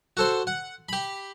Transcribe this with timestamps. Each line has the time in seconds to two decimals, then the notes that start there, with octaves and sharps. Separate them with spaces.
0.17 F#4 A4 C5
0.47 F#5
0.89 G4 B5